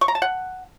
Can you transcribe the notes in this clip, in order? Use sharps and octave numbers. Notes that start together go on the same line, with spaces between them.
C#6
A#5
A5
F#5